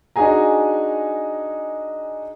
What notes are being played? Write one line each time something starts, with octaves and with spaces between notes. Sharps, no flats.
D4 D#4 F#4 G#4 G#5 A#5